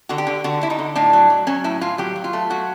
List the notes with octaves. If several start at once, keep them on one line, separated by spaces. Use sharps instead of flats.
D3 F#4
G4
D3
D3 F#4
D3 E4
D#4
D3
A2 D4
F#3
F#3
F#3 C#4
A2 E4
A2 F4
F#3 G4
F#3
F4
A3
F#3 F#4